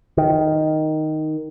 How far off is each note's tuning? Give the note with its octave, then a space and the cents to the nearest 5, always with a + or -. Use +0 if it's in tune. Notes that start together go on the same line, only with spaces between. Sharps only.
D#3 +0